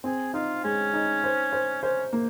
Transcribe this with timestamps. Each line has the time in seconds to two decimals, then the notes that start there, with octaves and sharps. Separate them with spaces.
0.04 C4 G#4
0.34 D#4 F4
0.64 G#3 C#4
0.93 D#4
1.24 C5
1.52 C5
1.83 C#4 C5
2.13 A#3